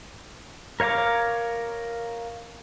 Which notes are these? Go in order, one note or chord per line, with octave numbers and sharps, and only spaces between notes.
A#4 C#5 F5 A#5 D6